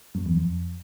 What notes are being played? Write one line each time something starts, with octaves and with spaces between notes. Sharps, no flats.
F#2
E2
F2